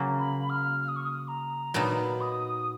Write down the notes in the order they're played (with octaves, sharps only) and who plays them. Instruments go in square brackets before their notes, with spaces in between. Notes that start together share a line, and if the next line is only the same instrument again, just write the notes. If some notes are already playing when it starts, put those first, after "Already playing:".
Already playing: [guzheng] C#3 F#3 A#3
[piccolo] B5
F6
F6
D#6
C#6
D#6
A#5
[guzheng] A#2 F#3 B3 D#4 [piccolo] B5
[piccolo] D#6